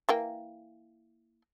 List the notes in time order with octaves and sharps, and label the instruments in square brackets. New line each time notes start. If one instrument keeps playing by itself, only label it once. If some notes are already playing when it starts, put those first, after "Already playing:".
[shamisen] E3 A#3 G5